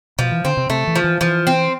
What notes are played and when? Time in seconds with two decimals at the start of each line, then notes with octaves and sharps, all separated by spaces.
0.19 B2 F3
0.31 E3
0.45 D3 C4
0.57 C3
0.69 C3 A3
0.87 E3
0.95 F3
1.04 E3
1.21 E3 F3
1.47 C4